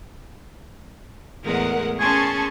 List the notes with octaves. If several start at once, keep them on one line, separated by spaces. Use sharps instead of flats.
E2 A2 G#3 A#4 F#5
C#4 G#4 G#5 A5 C6 C#6